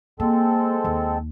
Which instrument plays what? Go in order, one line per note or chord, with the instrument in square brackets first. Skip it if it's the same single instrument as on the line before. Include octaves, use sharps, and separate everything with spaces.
[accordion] G#3 C4 A4 [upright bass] A#3
[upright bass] D#2